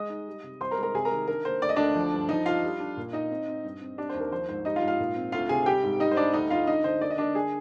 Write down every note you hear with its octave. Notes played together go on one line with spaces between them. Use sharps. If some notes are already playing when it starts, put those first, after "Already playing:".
Already playing: G#3 D#5 D#6
D#4
G3
C3
C2 C5 C6
A#4 A#5
G#3
A#4 A#5
C3 G#4 G#5
A#4 A#5
D#3
D4 A#4
A#3 C5
D2 D5
D#5
D2 D4 D5
F3
G2
F3 D#4 D#5
D4 F4 F5
G3
D4
A#2
D#4 D#5
C4
C4
G2
C4
G3 D4 D5
D#2 C5
A#4
F3 C5
G#2 C5
G3 D#4 D#5
F4 F5
G#2
F4 F5
A#2
C4
D2 F4 F5
C3 G#4 G#5
G3 G4 G5
G#2
G3 D#4 D#5
C5
G3 D4 D5
D2 D#4 D#5
D2 F4 F5
D3 D#4 D#5
D3 C5
A#3 D5
D#5
A#3 D4 D5
D3 G#4 G#5